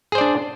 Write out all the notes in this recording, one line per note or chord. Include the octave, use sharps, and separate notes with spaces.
D4 G#4 C5 D5